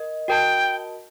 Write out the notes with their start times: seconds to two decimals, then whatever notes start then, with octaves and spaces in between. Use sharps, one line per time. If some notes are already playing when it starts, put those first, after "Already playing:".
Already playing: A#4 D#5
0.28 F#4 A#4 D#5 G5 A5